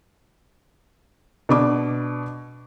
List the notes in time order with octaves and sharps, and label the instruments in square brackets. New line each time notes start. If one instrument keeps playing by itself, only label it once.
[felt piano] B2 D4 D6